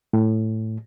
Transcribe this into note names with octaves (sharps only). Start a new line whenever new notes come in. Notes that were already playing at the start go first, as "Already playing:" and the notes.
A2